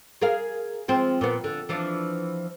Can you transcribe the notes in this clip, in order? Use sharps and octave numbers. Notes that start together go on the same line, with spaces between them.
G#4 A#4 F5
F3 G#3 C4
A#2 B3
D3
E3 F3 D4